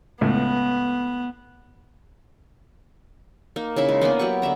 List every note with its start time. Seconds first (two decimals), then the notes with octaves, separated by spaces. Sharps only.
0.21 C#2 A2 B3
3.56 A#3 D#4
3.76 C#3 D#4 E4 E5
3.89 G#3
4.01 A#3 B3 D4 G#5
4.19 F#3 E4 G4 C#6
4.42 D3 B3 E5 A#5